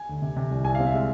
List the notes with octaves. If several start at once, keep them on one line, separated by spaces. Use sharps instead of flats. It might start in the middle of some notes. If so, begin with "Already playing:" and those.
Already playing: G#5
D2
C3
C3
C2
C2 G#5
C4 F5
E5
G#3 F5